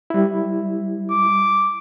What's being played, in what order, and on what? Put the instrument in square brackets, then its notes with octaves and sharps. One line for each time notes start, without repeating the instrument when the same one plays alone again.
[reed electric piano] G3 E4
[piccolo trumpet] D6